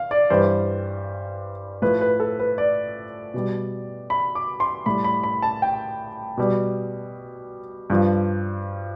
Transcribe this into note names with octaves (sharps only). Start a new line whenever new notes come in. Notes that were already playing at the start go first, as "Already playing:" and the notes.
Already playing: F5
D5
G2 E3 G3 C5
A2 F3 B4
B4
A4
B4
D5
B2 G3
B5
D6
C6
A2 G3 B5
B5
B5
A5
G5
B2 G3
G2 F3